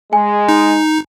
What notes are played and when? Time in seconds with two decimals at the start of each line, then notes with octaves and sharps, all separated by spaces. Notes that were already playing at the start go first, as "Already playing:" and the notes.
0.13 G#3 G#5
0.49 D#4